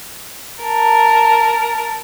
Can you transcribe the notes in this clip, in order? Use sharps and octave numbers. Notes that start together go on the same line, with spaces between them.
A#4 A5